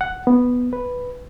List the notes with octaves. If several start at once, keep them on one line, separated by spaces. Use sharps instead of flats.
F#5
B3
B4